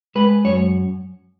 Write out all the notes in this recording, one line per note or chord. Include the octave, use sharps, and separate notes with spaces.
G#3 B4
F#2 C#5